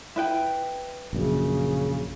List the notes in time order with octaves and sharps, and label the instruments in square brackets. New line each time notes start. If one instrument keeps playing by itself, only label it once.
[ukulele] E4 B4 G5
[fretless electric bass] A#1 F#2 [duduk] C#3